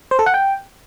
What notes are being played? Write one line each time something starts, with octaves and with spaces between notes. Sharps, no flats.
C5
A4
F#5
G5